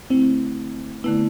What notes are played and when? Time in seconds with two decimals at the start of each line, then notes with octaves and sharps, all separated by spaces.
0.10 D3 A3 C4 E4
1.04 D3 A3 B3 E4